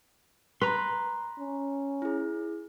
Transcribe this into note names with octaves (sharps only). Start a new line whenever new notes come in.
B4 A#5 C6
C#4
E4 G#4